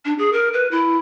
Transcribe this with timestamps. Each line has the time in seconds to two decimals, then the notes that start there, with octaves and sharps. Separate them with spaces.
0.05 D4
0.19 G#4
0.33 A#4
0.53 B4
0.71 E4